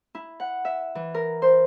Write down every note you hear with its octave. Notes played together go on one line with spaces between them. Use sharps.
E4
F#5
E5
E3
A#4
C5